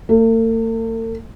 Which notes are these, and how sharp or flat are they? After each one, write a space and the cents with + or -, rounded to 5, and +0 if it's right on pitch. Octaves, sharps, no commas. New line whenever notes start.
A3 +45